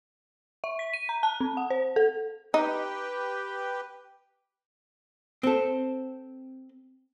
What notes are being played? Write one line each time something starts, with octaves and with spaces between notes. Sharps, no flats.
E5
B6
D#7
A#5
A5
C4
F#5
C5
A4
D#4 G4 B4 G5
C4 A4